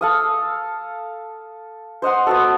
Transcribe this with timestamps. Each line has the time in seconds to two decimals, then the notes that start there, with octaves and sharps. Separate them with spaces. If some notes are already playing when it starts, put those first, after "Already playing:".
0.01 A4 F5 D#6
2.02 C5 D#5 F#5 C6
2.27 B3 F#4 A4